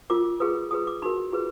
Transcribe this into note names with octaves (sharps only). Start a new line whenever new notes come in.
F4 A#4 D6
F4 G#4 B4 D#6
F4 G#4 B4 D#6
D6
D#4 F#4 A#4 B5
F4 G#4 B4